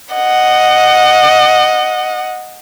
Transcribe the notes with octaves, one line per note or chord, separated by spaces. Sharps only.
D#5 F#5